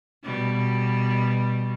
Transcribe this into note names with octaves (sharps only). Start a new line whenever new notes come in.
B2 G3